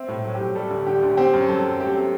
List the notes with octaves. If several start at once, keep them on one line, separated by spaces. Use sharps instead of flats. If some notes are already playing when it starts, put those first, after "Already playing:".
Already playing: C4 E5
A2
F#3
G4
A2
G3 A4
D2
D3 G4
D2
C4 G4
F#2
F#3 A4
F#2
A3 G4
C4